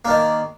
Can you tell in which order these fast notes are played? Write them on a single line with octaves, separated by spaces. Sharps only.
A#3 D4 D#3